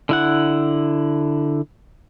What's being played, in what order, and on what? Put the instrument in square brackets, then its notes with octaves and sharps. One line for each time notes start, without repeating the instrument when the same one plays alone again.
[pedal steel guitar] D3 E4 F#5